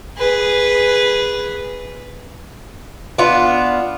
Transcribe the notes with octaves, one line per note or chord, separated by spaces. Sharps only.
G#4 B4
B3 D4 F4